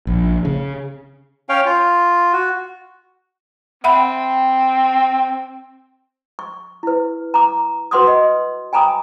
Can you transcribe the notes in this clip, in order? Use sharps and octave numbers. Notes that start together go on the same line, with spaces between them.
A#1
C#3
C#4 C#5 F5 G5
F4
F#4
C4 E5 F#5 B5
C#6
E4 B4
A#5 D6
F#4 B4 F#5 C6 D6 D#6
D#5
G5 G#5 A#5 B5 D6 D#6